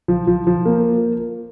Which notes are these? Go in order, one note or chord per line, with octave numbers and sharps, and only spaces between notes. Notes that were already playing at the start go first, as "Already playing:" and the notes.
F3
F3
F3
A#3